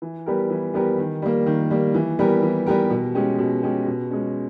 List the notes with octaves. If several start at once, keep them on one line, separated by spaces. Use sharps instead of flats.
E3
G3 B3 G4 A#4
E3
G3 B3 G4 A#4
D#3
G3 A#3
D#3
G3 A#3
E3
G3 B3 G4 A#4
E3
G3 B3 G4 A#4
B2
G#3 C#4 G4
B2
G#3 C#4 G4
B2
G#3 C#4